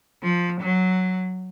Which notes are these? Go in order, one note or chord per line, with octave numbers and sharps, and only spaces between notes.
F3
F#3